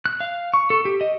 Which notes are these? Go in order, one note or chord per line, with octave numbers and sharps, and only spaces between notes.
F#6
F5
C#6
A4
G4
D#5